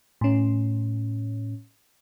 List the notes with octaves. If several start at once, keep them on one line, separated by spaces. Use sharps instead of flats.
A2 C#4